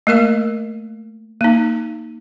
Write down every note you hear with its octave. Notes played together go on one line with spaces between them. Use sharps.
A3 A#3 A#4 F5
A#3 D#4